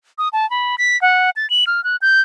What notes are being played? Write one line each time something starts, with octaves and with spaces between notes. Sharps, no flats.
D#6
A5
B5
B6
F#5
A6
F#7
F6
F#6
G6